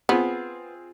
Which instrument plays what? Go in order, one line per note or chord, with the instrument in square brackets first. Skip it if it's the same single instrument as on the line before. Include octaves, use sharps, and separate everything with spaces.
[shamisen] B3 [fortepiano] C4 F4 G#4